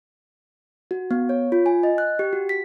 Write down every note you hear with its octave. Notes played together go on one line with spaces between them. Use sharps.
F#4
B3
C#5
F4
G#5
D#5
F#6
G4
F#4
B6